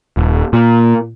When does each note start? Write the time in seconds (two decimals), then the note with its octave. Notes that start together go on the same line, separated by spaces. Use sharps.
0.17 D#1
0.53 A#2